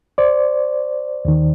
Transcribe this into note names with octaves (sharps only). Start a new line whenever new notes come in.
C5 D5
D#2 D#3